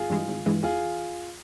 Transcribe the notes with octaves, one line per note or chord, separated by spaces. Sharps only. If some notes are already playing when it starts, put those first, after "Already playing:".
Already playing: G#1 F4 G#4
G2 E3 G#3
G#1
G2 E3 G#3
E2 F4 G#4